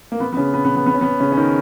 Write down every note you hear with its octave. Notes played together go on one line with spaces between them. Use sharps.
A#3
B3
B3
C#3 C#4
B3
B3
B3
B3
C#4
B3
C#3 C#4
C#4
D#3 D#4